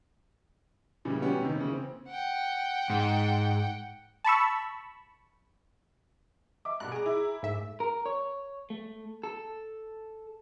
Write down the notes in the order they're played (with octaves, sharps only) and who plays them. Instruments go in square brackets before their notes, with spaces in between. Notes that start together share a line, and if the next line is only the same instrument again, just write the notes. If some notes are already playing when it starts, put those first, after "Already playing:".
[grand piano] A#2 C#3 E3 G3
G3 B3 C#4 F#4 G4
C3 D#3
C#3 E3 A#3 C#4
C4
[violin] F#5 G5
[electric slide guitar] G#2
[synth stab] A5 B5 C#6 E6
[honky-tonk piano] E5 D6
[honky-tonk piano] G2 B2 [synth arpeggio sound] F#6
[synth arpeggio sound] G#4 A#5 [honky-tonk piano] D7
[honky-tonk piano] E4
[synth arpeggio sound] G#2 E5 [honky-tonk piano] A3
[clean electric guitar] A#4
C#5
A3
A4